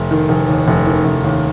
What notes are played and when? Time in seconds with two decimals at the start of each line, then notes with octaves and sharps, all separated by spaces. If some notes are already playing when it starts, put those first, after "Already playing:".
Already playing: F1
0.11 D#3
0.29 F1
0.48 D#2
0.68 F1
0.87 D#3
1.05 F1
1.24 D#2